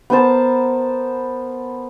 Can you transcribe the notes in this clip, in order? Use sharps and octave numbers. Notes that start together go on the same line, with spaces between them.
B3 A#4 C5 A5